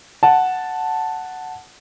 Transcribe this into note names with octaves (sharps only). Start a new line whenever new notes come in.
F#5 A5